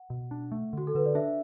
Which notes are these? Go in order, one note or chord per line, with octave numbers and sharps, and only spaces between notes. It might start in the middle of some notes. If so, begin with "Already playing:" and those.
Already playing: F#5
B2
D4
A3
D3 F#4
A4
D3 B4
D5
D4 E5